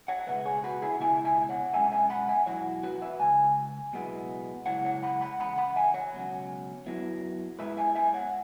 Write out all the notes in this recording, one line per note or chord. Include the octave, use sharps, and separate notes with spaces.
C#5 F#5
F#5
C#2 B2 G#3 B4 E5
G#4 C#5
F#4 B4
E4 G#4
C#2 B2 B3 E4 E5 G#5
E5 G#5
C#5 F#5
B1 B2 G#3 C#4 E5 G#5
E5 G#5
F#5 B5
E5 G#5
E2 B2 F#3 E4 C#5 F#5
F#4 B4
B4 E5
C#2 C#3 G#5
B1 B2 G#3 B3 E4
F#2 C#3 G#3 E4 C#5 F#5
C#5 F#5
F#5 B5
F#5 B5
C#2 C#3 E3 F#5 B5
F#5 B5
E5 G#5
C#5 F#5
C#2 B2 F#3 C#4
F#2 F#3 B3 E4
G#2 G#3 B3 E4 B4 E5
E5 G#5
E5 G#5
C#5 F#5